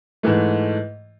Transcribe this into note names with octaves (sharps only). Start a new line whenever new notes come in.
G#2 E3 A3